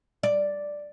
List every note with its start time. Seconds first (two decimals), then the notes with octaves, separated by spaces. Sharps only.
0.23 D5